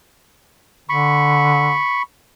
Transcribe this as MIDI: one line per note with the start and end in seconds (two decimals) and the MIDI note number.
0.89 1.78 50
0.89 2.02 83
0.89 2.02 85